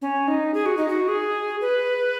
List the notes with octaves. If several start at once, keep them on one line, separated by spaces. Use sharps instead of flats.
C#4
D#4
G#4
F#4
D#4
F#4
G#4
B4